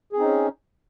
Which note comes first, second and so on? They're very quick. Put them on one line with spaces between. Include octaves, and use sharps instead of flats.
G#4 C4 D#4 C#4